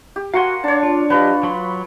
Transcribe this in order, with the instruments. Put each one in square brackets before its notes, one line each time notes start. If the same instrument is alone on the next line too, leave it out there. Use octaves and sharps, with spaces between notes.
[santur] G4
[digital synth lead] F#4 [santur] A#4 G#5 [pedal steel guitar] F5 F#5 C6
[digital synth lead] D4 [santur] C#5 A5
[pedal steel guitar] F4
[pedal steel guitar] F#3 G4 D#5 [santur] F4 B4
[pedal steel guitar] F#3 B5 C6